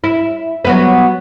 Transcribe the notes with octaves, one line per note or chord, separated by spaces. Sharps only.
E4
F#3 B3 B4